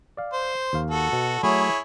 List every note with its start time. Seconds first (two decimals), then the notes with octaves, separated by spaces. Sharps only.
0.17 D5 F5
0.33 C5
0.73 D#2 F5
0.91 F#4 A4
1.12 B2
1.43 F#3 A3 E4 G#4 C#5